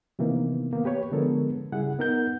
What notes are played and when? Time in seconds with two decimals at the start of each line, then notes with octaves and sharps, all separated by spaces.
0.19 C3 D#3 E3 A#3 B3
0.73 A#3 B3
0.85 G4 B4 C#5
1.12 D3 F3 G#3 B3 A4 A#4
1.72 C#3 G3 E4 G#4 F#5
1.99 B3 D#4 A#4 F#5 G6